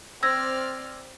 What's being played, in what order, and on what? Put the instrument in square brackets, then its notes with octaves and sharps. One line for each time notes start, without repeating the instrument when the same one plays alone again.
[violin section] C4 D5 F6 [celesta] E6 G#6 A#6